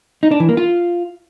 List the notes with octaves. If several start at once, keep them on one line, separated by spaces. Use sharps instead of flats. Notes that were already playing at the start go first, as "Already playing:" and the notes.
D#4
D4
E3
A#3
F4